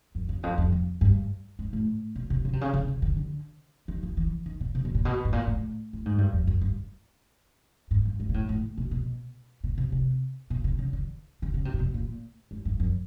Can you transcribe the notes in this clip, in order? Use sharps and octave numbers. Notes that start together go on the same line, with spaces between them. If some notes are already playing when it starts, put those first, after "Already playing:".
F#2
F2
E2
F2
F2
F2
G2
G#2
A2
B2
C3
C#3
C3
C#3
C#3
C#3
D3
D3
D#3
E3
E3
D#3
B2
C3
B2
A#2
B2
A2
A#2
A2
A2
G#2
G2
F2
F#2
G2
G#2
G2
G#2
A#2
A2
A2
B2
B2
B2
C3
C3
B2
C3
C#3
D3
D3
C#3
C3
A#2
B2
A#2
G#2
G2
F#2